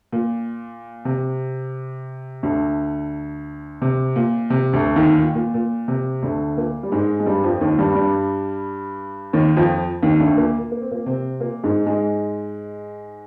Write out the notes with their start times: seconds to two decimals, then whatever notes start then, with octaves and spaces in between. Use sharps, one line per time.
0.13 A#2
1.05 C3
2.43 D2 D3
3.82 C3
4.16 A#2
4.50 C3
4.73 D2 D3
4.96 D#2 D#3
5.19 A#2
5.35 A#2
5.54 A#2
5.88 C3
6.22 D2 D3
6.57 A#2 A#3
6.83 G3
6.92 G#2 G#3
7.20 G#3
7.26 G2 G3
7.44 F2 F3
7.61 D#2 D#3
7.78 G2 G3
7.95 G2 G3
9.33 D#2 D#3
9.57 F2 F3
10.03 D#2 D#3
10.20 D2 D3
10.37 A#2 A#3
10.72 A#3
10.82 C4
10.91 A#2 A#3
11.06 C3 C4
11.40 A#2 A#3
11.63 G#2 G#3
11.86 G#2 G#3